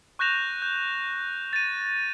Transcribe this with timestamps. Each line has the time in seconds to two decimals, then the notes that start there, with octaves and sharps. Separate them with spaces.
0.19 C#6 F#6 G6 A#6 E7 F7
0.62 G6
1.53 A6 D#7